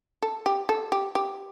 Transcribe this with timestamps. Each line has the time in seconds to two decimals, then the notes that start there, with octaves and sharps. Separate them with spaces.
0.22 A4
0.46 G4
0.69 A4
0.92 G4
1.15 G4